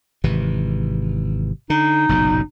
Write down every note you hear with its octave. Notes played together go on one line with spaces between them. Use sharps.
G#1 C3 E3
D3 D#4
F#1 B1 A#2